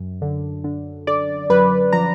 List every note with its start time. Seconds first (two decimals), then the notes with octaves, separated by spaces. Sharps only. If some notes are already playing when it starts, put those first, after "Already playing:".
Already playing: F#2
0.22 D3
0.64 D3
1.07 D3 D5
1.50 F#2 B4
1.93 F3 A#5